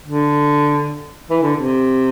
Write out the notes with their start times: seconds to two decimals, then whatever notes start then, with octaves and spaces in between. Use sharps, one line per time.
0.06 D3
1.30 E3
1.43 D3
1.56 C3